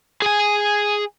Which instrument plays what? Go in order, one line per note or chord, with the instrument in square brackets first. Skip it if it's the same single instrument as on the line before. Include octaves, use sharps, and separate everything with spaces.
[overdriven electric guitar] G#4 G#5